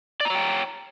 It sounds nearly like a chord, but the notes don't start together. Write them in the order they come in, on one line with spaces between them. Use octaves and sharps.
D5 A#5 C#5 G5